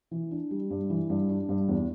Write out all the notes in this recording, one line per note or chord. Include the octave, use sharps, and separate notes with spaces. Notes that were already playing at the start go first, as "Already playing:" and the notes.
E3
D4
G3
G2
E3
G2
D4
G2
E2